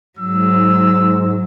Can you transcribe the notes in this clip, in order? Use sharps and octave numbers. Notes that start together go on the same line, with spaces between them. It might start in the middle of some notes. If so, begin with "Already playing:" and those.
G#2 F#3 E6